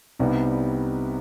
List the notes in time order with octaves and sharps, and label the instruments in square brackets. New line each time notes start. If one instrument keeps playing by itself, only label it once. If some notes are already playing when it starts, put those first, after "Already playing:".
[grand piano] C2 C3 G3 B3 D#4